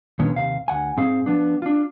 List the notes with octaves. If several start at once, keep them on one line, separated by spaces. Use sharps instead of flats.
D#2 A#2 D3 D#3 B3 C#4
D#2 C3 F5
D2 F#5 G#5
G#2 C4 G#4 F5
F3 B3 D4
D4 F4